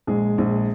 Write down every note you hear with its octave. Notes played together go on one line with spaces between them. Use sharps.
A#1 G#3 G#4
A#1